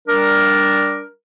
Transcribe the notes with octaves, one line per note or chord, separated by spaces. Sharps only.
G3 D4 A#4